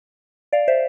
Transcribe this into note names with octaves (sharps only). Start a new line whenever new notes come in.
D5 F5
C5 E5